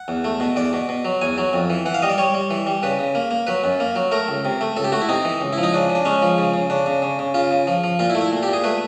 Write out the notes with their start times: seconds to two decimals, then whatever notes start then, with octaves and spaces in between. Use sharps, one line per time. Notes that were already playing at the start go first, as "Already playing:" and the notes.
Already playing: F#5
0.08 E2
0.24 A3
0.40 B2
0.56 E2 D5
0.73 B2
0.89 B2
1.05 F#3
1.21 E2 G#5
1.38 F#3
1.53 F2
1.70 E3
1.86 E3 F#5
1.94 F5
2.02 G3 D#5
2.10 D5
2.18 G3 C#5
2.34 G3
2.51 E3
2.66 G3
2.83 C#3 B4
2.99 C#3
3.15 A#3
3.31 A#3
3.47 F#3 B4
3.64 F#2
3.80 A#3
3.95 F#3
4.12 A3 A#4
4.28 C#2
4.45 C3
4.61 A3
4.77 C#2 A4
4.84 G4
4.92 A3 F#4
5.01 E4
5.09 C3 D#4
5.25 E3
5.40 C#2
5.53 E4
5.58 F3
5.63 D#4
5.73 C#3 D4
5.90 C#3
5.95 D4
6.05 G#3 C#4
6.22 F3
6.38 C#3
6.54 C#3
6.70 C#3 D4
6.86 C#3
7.02 C#3
7.19 C#3
7.34 C#3 F4
7.51 C#3
7.67 F3
7.84 F3
7.99 A#2 F4
8.10 E4
8.15 A3
8.21 E4
8.32 A#2
8.43 G4
8.48 A#2
8.53 G#4
8.64 A3 B4